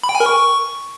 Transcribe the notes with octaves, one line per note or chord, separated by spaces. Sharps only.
B5
G5
G#5
A#4
C#6